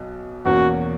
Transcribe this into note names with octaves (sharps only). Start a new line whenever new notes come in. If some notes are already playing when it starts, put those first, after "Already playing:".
Already playing: B1 B2
E2 B2 A#3 C#4 F#4